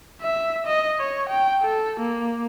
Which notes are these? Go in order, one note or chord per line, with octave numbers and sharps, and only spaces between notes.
E5
D#5
C#5
G5
A4
A#3